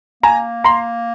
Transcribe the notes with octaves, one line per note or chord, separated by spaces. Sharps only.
A#3 G#5 A#5
A#5 C6